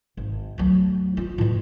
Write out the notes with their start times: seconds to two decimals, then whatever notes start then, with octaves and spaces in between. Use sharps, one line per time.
0.17 G#1
0.58 D2 F#3
1.17 F4
1.38 A2 E3